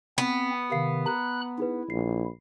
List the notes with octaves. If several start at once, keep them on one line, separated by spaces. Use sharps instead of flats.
B3 C4
C3 D#3 F5 C7
A#5 B5 F#6
D#4 E4 G#4 B4
A#1 C7